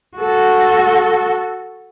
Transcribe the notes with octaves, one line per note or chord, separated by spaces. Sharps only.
F#4 A4